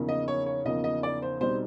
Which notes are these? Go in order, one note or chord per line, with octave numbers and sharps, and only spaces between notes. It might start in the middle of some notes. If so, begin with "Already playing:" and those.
Already playing: E2 C#3 F3 A#3 D#4
D#5
C#5
C#5
E2 C#3 F3 A#3 D#4 D#5
D#5
D5
C5
B1 B2 G3 C4 D#4 C5